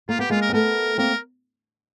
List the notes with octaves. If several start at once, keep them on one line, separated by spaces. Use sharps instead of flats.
A#3 F4
B3 G4
G#3 A#3 F4
A#4
C4
A3 B3 A#4
A#3 C4 A#4